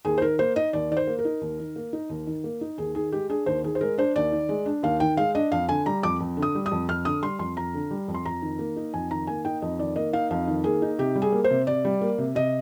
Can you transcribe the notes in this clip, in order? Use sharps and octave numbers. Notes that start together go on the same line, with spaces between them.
D#2 G#4
C5
D#3 A#4
A#3 C5
D#4 D#5
D#2 D5
D#3 D5
C5
A#3
A#4
D#4
D#2
D#3
A#3
D#4
D#2
D#3
A#3
D#4
D#2 G#4
D#3 G#4
G#3 G4
D4 G#4
D#2 C5
D#3 G#4
C5
G#3 A#4
D4 C5
D#2 D5
D#3
G#3
D4
D#2 F5
D#3 G5
G#3 F5
D4 D#5
F2 F5
D3 G#5
G3 A#5
F2 D6
F2
D3
D#6
G3
D#6
F2
F2 F6
D3 D#6
G3 C6
F2 C6
F2 A#5
D3
G3
F2
C6
F2 A#5
D#3
A#3
D#4
F2 G#5
D#3 A#5
A#3 G#5
D#4 G5
F2 D#5
D#3 D5
A#3 D#5
D#4 F5
F2 F5
D#3
A#3 G#4
D#4
C3 G4
G3
G#4
A#3
C5
C3
C3 D5
G3
A#3
C3
C3 D#5